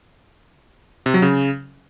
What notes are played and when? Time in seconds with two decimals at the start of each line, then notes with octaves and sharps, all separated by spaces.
1.06 C3
1.14 F#3
1.22 C#3